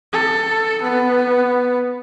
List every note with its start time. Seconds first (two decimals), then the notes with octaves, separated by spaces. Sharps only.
0.12 A4
0.82 B3